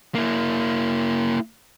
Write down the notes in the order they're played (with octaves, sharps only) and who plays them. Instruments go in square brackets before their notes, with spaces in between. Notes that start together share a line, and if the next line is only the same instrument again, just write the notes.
[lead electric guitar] A#3 E4